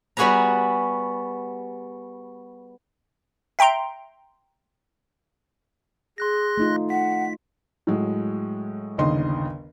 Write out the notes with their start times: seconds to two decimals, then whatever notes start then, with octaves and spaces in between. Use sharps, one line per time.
0.17 G3 B3 F#4 G#4 B4 A#5
3.59 E5 G5 A#5 C6 D7
6.18 G#4 C6 F#6 A#6
6.57 A3 D#4 F4
6.90 F#5 B6
7.87 A2 F#3 G#3
8.98 G1 D#2 C#3 D#5 C6